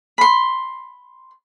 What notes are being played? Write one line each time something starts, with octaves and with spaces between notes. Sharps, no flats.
B5 C6